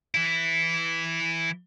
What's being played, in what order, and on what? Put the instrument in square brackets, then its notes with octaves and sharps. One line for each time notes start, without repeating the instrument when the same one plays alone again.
[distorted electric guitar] E3 E4